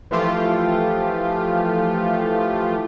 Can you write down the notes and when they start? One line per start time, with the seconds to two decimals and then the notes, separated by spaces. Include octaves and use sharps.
0.11 E3 F3 A3 F4 G4